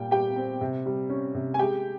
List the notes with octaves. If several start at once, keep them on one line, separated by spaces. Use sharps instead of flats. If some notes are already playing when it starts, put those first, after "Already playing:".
Already playing: A#2 G3 G5
G3 G4 G5
C4
C3
G3
C#4
C3
G#5
G#3 G4 G5